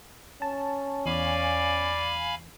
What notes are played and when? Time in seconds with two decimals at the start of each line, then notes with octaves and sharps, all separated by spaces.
0.42 C#4 A5
1.06 E2 D5 F5 G#5 B5